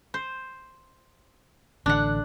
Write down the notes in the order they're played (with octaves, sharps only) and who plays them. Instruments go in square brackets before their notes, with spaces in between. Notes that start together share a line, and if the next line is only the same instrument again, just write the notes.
[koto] C5
[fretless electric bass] A1 D3 [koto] D4 F#5